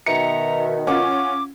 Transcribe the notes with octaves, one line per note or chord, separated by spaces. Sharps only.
B2 D#3 E5 A#5 C#7
C#4 F4 F#5 D6